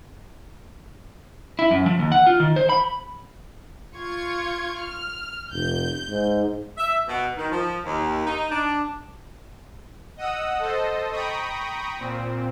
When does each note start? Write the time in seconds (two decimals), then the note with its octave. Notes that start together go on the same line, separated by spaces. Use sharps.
1.59 E4
1.71 F#2
1.86 F3
1.99 D#2
2.12 F#5
2.27 F4
2.40 D#3
2.56 C5
2.69 B5
3.95 F4 C#6 G#6
4.79 F6
5.51 F1 G6
6.09 G#2
6.77 E5
7.08 B2
7.37 D#3
7.51 F3
7.85 D#2
8.26 D#4
8.51 D4
10.17 D#5 F#5 D#6 E6
10.59 A4 C5 D#5
11.11 G5 A#5 B5 C#6 D#6
11.98 A#2 C4